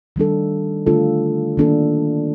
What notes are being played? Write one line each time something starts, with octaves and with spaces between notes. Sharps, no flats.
D#3 G3 D4 A4
D3 A3 D4 F4 A4
D#3 A#3 D4 A4